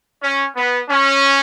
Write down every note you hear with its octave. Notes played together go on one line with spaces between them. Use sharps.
C#4
B3
C#4